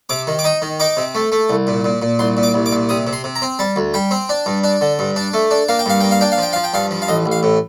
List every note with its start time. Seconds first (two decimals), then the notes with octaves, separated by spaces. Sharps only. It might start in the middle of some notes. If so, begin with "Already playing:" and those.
0.09 C3 D6
0.27 D#3
0.39 D6
0.44 D#4 D#6
0.62 D#3
0.80 D#4 D6
0.97 C3
1.15 A3
1.32 A3
1.50 C2
1.67 A#2
1.84 A#2
2.02 A#2
2.19 C2 C6
2.37 A#2
2.43 D6
2.54 C2
2.66 D6
2.72 A#2
2.89 C3 D#6
3.07 C3
3.13 C6
3.24 C3
3.36 A#5
3.42 C4
3.59 G3 A5
3.76 D2
3.94 G3 G5
4.11 C4
4.29 D4
4.46 G2
4.64 D4
4.81 D3
4.99 G2
5.16 D4
5.33 A3
5.51 D4
5.68 A#3 F5
5.79 G5
5.86 G2 F5
6.00 A#3 G5
6.11 F5
6.21 D4 G5
6.32 F5
6.38 F3 G5
6.53 F3 F5
6.64 G5
6.74 G2 F5
6.91 F3
7.02 F5
7.08 A1 D#5
7.26 A1
7.32 F5
7.43 A2